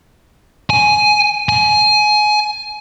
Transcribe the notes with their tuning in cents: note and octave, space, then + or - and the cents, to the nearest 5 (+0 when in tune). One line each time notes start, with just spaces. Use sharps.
G#5 +10
G#5 +20